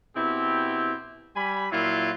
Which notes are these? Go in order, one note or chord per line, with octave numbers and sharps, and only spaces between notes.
B2 C4 E4 G4
G3 G#5 B5
A#2 F#3 E4 F4